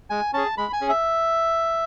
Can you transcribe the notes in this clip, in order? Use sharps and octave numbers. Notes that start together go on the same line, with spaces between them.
G#3 G#5
C#4 G#4 A5
G#3 B5
G#5
C#4 G#4
E5